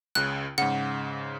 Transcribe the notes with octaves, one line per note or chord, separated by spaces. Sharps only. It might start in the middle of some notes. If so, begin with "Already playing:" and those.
C#2 C#3 F#6
G#2 C#3 F#5